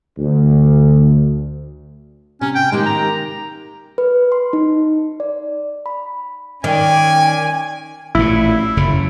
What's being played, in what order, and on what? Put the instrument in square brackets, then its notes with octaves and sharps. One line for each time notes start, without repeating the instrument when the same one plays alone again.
[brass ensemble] D2
[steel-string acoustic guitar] C3 [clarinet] C#4
[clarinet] G5
[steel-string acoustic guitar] D#3 A#3 G4 [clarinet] G#3
[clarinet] A#5
[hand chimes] B4
C6
D#4
D5
B5
[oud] D#3 [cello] C#4 D5 [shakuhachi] G5 [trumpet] G#5
[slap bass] A1 A#2 [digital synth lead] E4
[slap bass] F#1 F#2 C#3